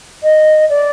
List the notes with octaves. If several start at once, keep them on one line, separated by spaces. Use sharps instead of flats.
D#5
D5